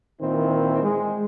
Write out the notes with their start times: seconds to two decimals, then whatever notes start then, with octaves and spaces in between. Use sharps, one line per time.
0.21 A#2 D#3 E3 C4 E4
0.83 G#3